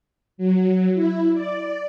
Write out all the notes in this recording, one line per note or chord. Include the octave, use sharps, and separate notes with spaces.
F#3
E4
D5